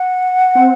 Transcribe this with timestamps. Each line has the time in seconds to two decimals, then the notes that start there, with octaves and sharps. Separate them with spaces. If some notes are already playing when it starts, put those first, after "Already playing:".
Already playing: F#5
0.55 C4